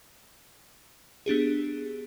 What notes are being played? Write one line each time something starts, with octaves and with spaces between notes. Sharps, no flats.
B3 D4 G4 G#4